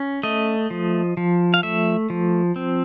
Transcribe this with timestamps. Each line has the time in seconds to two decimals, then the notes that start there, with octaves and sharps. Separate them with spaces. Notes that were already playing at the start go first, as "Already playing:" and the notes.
Already playing: C#4
0.23 A3 D#5
0.70 F3
1.17 F3
1.54 F5
1.63 A3 E5
2.10 F3
2.56 C4